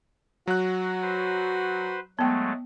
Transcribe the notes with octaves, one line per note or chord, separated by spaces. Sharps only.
F#3 F#4 F#6
B4 C5
F#3 G#3 A3 B3 G5